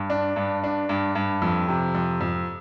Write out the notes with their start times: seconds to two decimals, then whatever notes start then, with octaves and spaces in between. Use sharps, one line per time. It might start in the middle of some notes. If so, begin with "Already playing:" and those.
Already playing: G2
0.10 D4
0.36 G2
0.64 D4
0.89 G2
1.15 G2
1.42 F2
1.68 C3
1.95 F2
2.21 F2